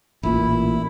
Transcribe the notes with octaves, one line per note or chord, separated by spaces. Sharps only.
A1 A#2 E4